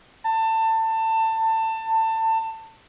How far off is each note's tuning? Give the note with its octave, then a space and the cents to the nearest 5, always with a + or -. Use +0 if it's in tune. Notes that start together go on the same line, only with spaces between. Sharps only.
A5 +25